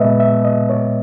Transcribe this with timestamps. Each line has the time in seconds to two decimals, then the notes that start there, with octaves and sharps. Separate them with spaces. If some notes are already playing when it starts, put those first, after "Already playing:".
Already playing: A#2 G#3 B3 B4 D#5 E5
0.20 E5
0.45 D#5
0.70 C#5